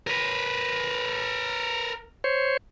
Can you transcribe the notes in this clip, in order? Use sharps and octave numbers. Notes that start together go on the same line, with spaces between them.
A#4 B4
C5 C#5